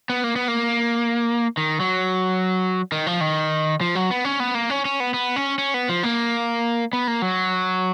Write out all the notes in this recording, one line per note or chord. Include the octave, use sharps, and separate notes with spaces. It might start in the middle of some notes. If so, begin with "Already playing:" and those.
B3
A#3
B3
A#3
D#3
F#3
D#3
F3
D#3
F3
F#3
B3
C#4
B3
A#3
C#4
C#4
B3
B3
C#4
C#4
B3
F3
A#3
B3
A#3
F#3